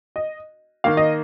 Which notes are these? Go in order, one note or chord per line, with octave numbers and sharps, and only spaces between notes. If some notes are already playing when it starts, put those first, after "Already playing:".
D#5
D#3 A#3 F5
D#5